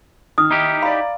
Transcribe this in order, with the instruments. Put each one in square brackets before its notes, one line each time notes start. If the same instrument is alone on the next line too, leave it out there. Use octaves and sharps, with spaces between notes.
[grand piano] D#3 [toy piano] D#6 [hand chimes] F6
[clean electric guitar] D#4 E4 G4
[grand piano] D5 A#5 [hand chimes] F5 [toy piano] B5